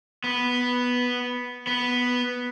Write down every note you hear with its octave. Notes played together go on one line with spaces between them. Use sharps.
B3
B3